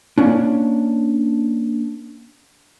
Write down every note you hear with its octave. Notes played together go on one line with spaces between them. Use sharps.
A#3 C#4 D4